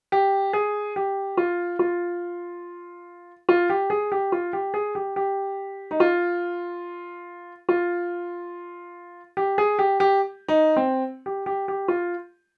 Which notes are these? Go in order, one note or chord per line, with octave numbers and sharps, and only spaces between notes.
G4
G#4
G4
F4
F4
F4
G4
G#4
G4
F4
G4
G#4
G4
G4
D#4
F4
F4
G4
G#4
G4
G4
D#4
C4
G4
G4
G4
F4